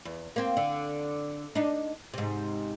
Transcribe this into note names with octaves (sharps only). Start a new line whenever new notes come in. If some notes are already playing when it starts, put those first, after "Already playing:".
E2
A#3 C4
D3
D4 D#4
G#2 C3